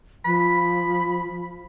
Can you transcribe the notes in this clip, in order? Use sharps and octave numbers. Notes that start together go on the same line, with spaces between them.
F3 B5